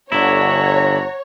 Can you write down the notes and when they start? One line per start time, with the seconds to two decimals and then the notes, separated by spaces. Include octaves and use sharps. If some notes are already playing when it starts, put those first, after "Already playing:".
0.12 G1 D3 E4 C#5 F#5 A5 A#5